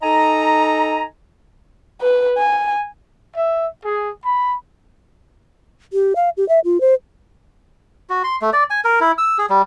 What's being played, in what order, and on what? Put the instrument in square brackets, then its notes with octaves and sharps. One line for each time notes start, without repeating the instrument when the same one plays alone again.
[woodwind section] D#4 A4 D#5 G#5 A#5
[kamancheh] B4
G#5
[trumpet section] E5
G#4
B5
[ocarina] G4
F5
G4
E5
F4
C5
[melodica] F#4
C6
A3
D5
G#5
A#4
E4
E6
G#4
G3